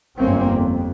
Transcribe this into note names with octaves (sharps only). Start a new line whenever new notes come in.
G1 F#2 A#3 C4 C#4
F2